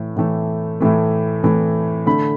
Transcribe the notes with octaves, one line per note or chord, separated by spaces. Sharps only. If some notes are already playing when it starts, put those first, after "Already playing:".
Already playing: A2 E3 A3
A2 E3 A3
A2 E3 A3
A2 E3 A3
D3 A3 B5